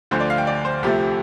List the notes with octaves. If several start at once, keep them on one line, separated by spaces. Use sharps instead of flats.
D2 D3 F3 C5
D5
F5
G5
D5
C5
C2 C3 F3 A3 G4